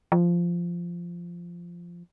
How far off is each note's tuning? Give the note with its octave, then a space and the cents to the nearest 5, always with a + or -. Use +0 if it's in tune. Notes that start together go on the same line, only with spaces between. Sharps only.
F3 -10